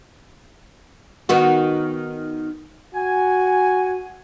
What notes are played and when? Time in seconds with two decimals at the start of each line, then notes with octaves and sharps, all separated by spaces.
1.29 D#3 B3 F#4
2.95 F#4 G#5